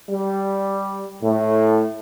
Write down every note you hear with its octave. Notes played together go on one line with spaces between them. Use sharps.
G3
A2